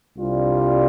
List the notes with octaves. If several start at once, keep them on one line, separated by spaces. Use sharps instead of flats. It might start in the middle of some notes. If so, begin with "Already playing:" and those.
C2 C3 G3 D4 F4